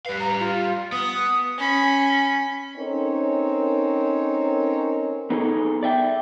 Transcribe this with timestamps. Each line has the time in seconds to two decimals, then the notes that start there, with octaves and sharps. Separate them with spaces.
0.06 G3 B4 F5
0.20 A#5
0.39 F4
0.92 B3 D#6
1.58 C#4 B5
2.77 C4 C#4 D#4 A4 A#4 C#5
5.30 B3 D#4 G#4 A4
5.83 D5 E5 G5